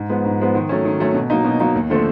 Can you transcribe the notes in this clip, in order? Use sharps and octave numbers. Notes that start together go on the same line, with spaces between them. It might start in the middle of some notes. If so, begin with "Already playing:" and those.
Already playing: G#2
F3 G#3 B3
G#2
F3 G#3 B3
D#3
F#3 A3 C#4
D#3
F#3 A3 C#4
B2
F#3 A#3 D#4
B2
F#3 A#3 D#4
D#2
D3 F3 A3 C4